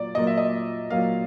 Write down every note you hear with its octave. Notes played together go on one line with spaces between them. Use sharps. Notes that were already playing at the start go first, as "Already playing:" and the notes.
Already playing: A#2 F#3 A#3 D5
A#2 F#3 A#3 D#5
E5
D#5
A#2 F#3 A#3 F5